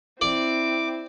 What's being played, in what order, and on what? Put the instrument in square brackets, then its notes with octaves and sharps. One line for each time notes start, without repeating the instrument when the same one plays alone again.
[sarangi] C4 [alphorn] E4 [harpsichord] D5 [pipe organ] D6